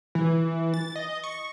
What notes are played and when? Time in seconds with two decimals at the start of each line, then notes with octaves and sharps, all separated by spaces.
0.15 E3
0.74 A6
0.96 D#5
1.24 C#6